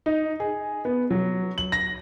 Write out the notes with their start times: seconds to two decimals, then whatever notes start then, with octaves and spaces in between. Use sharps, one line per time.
0.06 D#4
0.40 G#4
0.85 B3
1.11 F#3
1.58 F#7
1.72 A#6